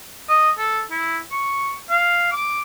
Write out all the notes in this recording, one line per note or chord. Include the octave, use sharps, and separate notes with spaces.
D#5
A4
E4
C#6
F5
D6